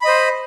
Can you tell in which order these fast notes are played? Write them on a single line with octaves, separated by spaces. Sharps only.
B5 D#5 C5